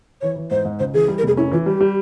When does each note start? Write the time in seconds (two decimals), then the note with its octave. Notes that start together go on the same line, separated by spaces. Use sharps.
0.21 E3 C#5
0.36 E3
0.51 G#2 C5
0.65 G#2
0.79 C#2 C5
0.94 E3 G#4
1.08 G3
1.18 A#4
1.23 F1 G#4
1.37 C#4 E4
1.51 E3 F4
1.66 G3 G4
1.80 G3